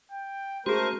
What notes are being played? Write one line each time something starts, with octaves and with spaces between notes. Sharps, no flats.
G5
G#3 A3 C#4 F#4 G#4 A#4 C5